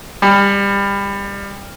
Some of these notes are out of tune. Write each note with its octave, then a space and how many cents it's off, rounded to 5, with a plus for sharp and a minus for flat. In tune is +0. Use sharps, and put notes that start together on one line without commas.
G3 +25